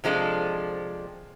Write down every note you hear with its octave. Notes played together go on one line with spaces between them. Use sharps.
C3 F3 G#3 D4 A4